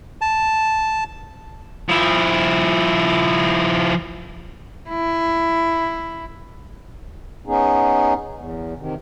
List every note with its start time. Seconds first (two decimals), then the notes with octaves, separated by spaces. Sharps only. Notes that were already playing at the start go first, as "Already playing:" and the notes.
0.21 A5
1.88 F3 E4
4.89 E4
7.47 B3 C#4 D#4 G#4
8.34 E2
8.77 C3 D#3